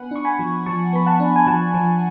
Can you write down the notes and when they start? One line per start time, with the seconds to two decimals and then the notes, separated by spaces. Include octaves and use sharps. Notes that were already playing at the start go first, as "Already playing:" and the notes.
Already playing: B3 D4 F#5 G#5 B5
0.11 D4 C#6
0.25 G#5 B5
0.39 F3
0.66 F3 A5 C#6
0.93 B3 B5
1.06 F#5 A5
1.20 D4
1.36 G#5
1.47 F3 F#5 A5
1.74 F3